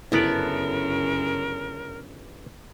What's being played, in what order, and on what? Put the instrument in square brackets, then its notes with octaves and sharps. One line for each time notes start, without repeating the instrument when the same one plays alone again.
[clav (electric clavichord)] G1 B3 D5 [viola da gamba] F#2 C#3 [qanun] E4 A4 [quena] A#4